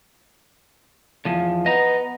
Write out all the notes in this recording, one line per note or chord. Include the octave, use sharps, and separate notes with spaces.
E2 F3
B3 D#5 A#5